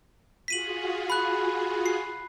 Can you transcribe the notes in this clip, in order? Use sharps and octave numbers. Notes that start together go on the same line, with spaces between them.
F4 F#4 G#4 B6 D#7 F#7
B5 F#6
C7